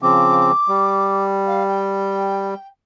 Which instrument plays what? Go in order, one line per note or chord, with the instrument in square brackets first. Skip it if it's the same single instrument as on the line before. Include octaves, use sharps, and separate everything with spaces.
[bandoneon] C#3 F3 C4 [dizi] D6
[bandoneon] G3
[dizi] F5
G5